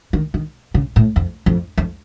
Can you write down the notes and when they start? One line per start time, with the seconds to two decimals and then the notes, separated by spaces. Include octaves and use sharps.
0.13 D#3
0.34 D#3
0.74 C#3
0.96 A2
1.16 F2
1.46 F2
1.78 F2